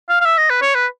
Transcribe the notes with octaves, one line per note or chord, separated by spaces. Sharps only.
F5
F5
E5
D#5
B4
C#5
B4